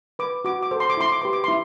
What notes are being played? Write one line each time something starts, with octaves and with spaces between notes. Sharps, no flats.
B4 D6
F#4 D6
D6
A4 C5
C6
D6
E4 C6
D6
G4 B4 C6
D6
E4 C6